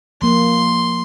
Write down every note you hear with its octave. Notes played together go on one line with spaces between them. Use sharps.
F3 A#3 C6